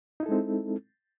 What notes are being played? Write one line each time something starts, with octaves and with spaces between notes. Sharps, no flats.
G#3 C4 D#4 E4 A4